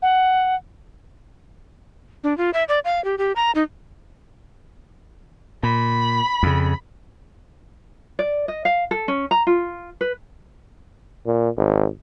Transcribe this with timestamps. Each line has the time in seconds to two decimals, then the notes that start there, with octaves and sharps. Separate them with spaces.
0.02 F#5
2.24 D4
2.38 F4
2.54 E5
2.69 D5
2.85 F5
3.05 G4
3.18 G4
3.36 A#5
3.55 D#4
5.63 A#2 B5
6.43 F2 C#3
8.19 D5
8.48 D#5
8.65 F5
8.91 A4
9.08 C#4
9.31 A#5
9.47 F4
10.01 B4
11.26 A#2
11.57 G#1